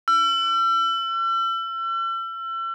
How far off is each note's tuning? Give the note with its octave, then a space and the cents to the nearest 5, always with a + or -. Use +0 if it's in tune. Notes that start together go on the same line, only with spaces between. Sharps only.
E6 +40